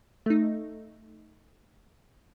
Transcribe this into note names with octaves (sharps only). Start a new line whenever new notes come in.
A3 D#4